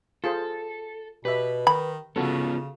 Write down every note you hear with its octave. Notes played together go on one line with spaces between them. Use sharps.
F4 G#4 A4 C5
B2 G4 B4 E5
D#3 B5
C#3 B3 C#4 F4 F#4 A4